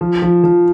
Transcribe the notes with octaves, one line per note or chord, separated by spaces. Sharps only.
F3
F3
F3